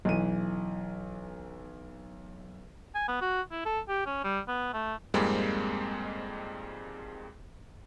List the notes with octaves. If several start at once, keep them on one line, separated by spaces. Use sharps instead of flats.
B1 E3 D#7
G#5
B3
F#4
E4
A4
G4
C#4
G3
B3
A3
F2 G#2 G3 G#3 A#3 C4